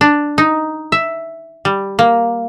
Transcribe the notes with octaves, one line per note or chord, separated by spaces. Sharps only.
D4
D#4
E5
G3
A#3